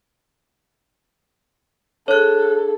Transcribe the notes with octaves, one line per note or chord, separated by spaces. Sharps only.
D4 G#4 A4 C#5 F#6